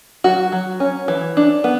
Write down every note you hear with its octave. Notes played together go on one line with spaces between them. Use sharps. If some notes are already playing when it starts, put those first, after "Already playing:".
F#3 F#4
F#3
C#4
E3
D4
B3